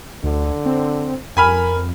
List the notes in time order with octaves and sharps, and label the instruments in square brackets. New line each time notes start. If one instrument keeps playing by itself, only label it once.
[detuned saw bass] D2 [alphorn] D3
[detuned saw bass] C4
[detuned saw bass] F2 [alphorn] A#4 [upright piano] G#5 B5 F6